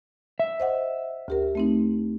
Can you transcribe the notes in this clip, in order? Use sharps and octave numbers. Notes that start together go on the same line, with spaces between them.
E5
C5 D#5 F#5
D2 G4 A#4
A3 C4 D#4